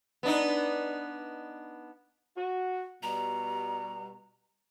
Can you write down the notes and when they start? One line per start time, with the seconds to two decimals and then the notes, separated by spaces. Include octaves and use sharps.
0.23 B3 D4 D#4
2.37 F#4
3.03 B2 G3 A#5